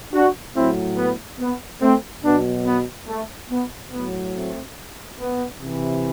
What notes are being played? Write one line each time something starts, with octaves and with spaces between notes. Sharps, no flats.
D4 F#4
A2 F#3 C4 E4
B3
B3
A3 C4
B2 F#3 B3 D4
B3
A3
B3
A2 F#3 B3
A3 C4
B3
C3 E3